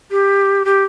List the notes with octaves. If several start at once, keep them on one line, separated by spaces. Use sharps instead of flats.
G4
G4